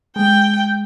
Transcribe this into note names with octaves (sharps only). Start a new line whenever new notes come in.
G#3 G5